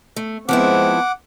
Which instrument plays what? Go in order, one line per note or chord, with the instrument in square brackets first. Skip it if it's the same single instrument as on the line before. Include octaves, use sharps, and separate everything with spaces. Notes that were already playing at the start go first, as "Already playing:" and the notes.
[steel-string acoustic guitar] A3
[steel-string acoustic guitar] F3 B3 E4 [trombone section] G#3 C4 [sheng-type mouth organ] F#5 D6